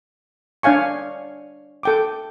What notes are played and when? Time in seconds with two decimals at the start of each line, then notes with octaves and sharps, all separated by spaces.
0.63 D4 C#5 F5 G#5 C#6
1.83 A4 G5 D6